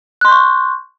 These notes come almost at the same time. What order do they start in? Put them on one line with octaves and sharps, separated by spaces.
F#6 C6 G6 C#6